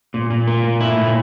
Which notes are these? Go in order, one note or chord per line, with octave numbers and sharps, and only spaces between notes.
A#2
A#2
A#3
A#2
E4
A#2